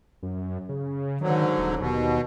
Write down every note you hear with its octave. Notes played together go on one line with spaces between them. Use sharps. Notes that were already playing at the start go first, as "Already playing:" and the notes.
F#2
C#3
G#2 D3 D#3 F#3
D#1
D#2 B2